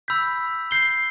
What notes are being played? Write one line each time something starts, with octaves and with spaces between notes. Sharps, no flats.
B5 E6 G6 B6
G6 C7 G7